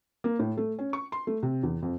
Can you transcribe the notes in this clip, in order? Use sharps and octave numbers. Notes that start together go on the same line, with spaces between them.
A#3
A2
A3
C#4
C#6
C6
A3
C3
E2
F2